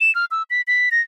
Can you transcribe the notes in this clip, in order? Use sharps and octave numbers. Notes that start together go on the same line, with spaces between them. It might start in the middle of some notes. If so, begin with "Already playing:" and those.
E7
F6
E6
B6
B6
A#6